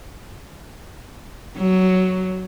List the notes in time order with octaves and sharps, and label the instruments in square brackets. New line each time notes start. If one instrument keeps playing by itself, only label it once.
[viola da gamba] F#3